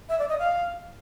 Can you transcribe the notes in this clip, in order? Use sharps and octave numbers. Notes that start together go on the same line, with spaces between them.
E5
D5
D#5
F5